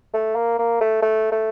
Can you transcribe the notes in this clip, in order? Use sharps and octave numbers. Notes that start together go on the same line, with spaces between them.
A3
A#3
A#3
A3
A3
A3